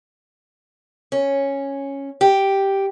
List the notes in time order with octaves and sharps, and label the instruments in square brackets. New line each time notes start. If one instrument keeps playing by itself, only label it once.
[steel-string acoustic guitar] C#4
G4